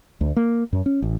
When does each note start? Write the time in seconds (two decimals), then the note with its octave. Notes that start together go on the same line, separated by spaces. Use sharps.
0.21 D2
0.36 A#3
0.73 F#2
0.86 C#4
1.02 A1